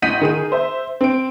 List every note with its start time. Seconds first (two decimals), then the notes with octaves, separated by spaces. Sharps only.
0.02 A1 D#5 F#5 G6 B6 D#7
0.21 D#3 G#4 D#7
0.52 C5 E5
1.01 C4 D7